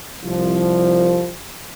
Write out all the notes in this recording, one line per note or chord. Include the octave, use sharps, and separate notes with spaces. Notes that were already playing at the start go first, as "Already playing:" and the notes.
C2 F3